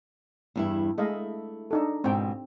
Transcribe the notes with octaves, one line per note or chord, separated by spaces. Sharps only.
E2 G2 E4
G#3 A3 E4 D#5 F5
D4 D#4 A4
G#2 B2 C4 G5